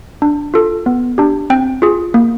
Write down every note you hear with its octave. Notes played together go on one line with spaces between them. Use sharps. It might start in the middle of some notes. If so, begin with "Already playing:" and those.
D4
F4 A4
B3
D4 G4
C4 G5
F4 G#4
A#3